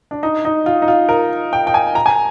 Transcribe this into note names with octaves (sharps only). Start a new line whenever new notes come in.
D4
D#4
D#4
F4
D#4
F4
A#4
G5
G5
G#5
A#5
G#5